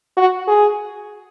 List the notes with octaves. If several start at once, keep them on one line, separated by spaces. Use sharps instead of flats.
F#4
G#4